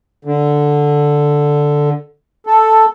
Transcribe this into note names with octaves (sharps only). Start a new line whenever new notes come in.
D3
A4